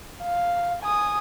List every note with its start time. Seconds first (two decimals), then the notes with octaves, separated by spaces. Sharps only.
0.22 F5
0.83 G#5 D#6